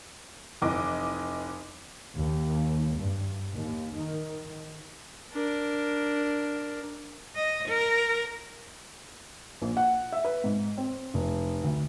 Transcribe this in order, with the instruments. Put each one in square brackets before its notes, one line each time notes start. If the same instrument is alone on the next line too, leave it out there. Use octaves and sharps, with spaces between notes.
[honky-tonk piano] F1 E3 D#5 D6
[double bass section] D#2
G2
D#2
D#3
[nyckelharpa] D4 A#4
[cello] D#5
A#4
[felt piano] A#1
F#5
E5
B4
G#2
C4
F1
D2